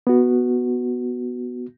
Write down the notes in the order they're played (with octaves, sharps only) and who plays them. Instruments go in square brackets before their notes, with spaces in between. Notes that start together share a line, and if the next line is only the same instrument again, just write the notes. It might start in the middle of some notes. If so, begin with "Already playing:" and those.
[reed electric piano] B3 F#4